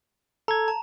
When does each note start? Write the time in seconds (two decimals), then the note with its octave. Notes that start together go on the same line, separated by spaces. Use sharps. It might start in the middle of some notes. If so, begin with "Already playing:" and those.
0.48 A4 A#5 G#6
0.68 A5